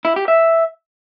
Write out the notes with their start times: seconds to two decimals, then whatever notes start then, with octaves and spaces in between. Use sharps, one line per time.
0.05 E4
0.16 G4
0.28 E5